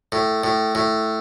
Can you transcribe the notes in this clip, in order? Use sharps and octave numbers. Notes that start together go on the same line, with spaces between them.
A2
A2
A2